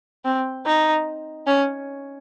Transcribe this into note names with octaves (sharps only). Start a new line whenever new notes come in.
C4
D#4
C#4